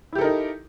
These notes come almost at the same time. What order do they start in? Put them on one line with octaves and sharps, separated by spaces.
E4 G4 A4 A#4 D#4